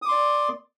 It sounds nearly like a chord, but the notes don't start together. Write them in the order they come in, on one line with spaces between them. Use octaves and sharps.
D#6 D6 C6 D5